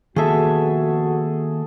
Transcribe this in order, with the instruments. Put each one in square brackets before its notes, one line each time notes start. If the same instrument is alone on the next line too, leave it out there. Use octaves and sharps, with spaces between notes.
[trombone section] F2 B2 F#4 [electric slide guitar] D#3 A#3 E5 [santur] G#4 A4